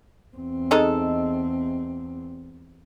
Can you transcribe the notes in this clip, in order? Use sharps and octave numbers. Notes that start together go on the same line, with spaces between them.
E2 C4
G#3 D#4 A4